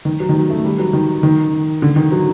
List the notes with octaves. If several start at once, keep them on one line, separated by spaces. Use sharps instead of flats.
D#3
F#3
D#3
F#3
A3
G3
F#3
D#3
D#3
D3
D#3
F#3